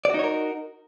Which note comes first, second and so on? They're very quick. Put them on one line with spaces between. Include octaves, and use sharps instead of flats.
D5 F#4 D#4 C#5 A#4